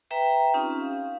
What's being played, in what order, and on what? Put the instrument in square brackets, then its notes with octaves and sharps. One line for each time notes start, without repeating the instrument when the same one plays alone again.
[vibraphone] B4 E5 G5 A#5
C4 C#4 D#4 F4 G4
F5